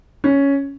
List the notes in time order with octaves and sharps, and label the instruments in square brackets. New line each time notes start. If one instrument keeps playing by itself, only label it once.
[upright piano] C#4